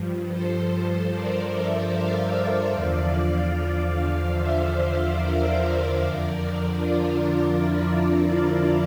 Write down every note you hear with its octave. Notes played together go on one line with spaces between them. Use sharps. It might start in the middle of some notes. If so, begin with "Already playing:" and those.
Already playing: G2 F3
A4 C5
A#4 D5
C5 E5
D5 F5
E2 D3 F3 D5 F5
D5 F5
D5 F5
C5 E5
A#4 D5
F2 D3 F3
D4 F4
D4
E4
D4